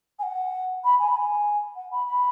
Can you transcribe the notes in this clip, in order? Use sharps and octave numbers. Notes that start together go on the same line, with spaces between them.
G#5
F#5
B5
G#5
B5
G#5
F#5
B5
B5